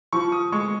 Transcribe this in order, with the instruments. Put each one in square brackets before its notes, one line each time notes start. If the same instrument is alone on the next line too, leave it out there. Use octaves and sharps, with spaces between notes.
[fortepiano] F3 [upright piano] C#6
[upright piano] D#6
[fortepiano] G#3 [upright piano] C#6